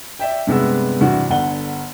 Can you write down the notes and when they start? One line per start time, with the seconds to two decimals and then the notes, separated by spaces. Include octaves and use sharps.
0.19 D5 E5 G5
0.47 G2 C3 G#3 B3 E6
1.01 G2 C3 E3 F#4
1.30 G1 D3 F#5 G7